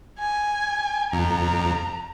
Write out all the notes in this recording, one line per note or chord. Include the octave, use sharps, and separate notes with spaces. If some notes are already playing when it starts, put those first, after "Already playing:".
G#5
F2 A#5